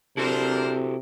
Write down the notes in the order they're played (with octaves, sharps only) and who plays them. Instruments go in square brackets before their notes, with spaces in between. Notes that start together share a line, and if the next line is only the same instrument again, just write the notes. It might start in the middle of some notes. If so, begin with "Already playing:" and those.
[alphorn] C3 [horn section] D4 A#4 C5 [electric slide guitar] E4 F#4 A4